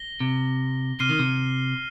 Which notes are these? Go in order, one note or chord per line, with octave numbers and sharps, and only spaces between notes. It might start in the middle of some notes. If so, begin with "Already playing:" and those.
Already playing: A#6 G7
C3
C3 F6 C7 D#7 G7
D#3
C3